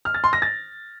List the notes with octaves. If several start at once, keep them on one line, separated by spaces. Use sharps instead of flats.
F6
A6
C6
A#6
A6